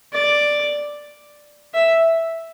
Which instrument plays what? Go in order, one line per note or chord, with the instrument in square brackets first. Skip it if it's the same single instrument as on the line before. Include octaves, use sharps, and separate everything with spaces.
[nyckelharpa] D5
E5